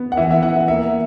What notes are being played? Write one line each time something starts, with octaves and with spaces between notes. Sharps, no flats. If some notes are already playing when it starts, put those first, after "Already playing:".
Already playing: B3
F#5
E3 E5
E5
E4 F#5
E5
A#3 E5